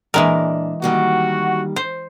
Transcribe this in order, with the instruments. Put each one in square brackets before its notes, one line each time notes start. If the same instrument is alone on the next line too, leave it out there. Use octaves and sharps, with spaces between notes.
[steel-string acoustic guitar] A#2 D4 [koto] E3 G#3 A#4
[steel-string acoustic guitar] D#3 G3 A#3 [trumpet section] F#4
[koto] C5